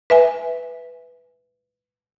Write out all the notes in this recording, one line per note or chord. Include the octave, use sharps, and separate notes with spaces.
B4 E5 G#5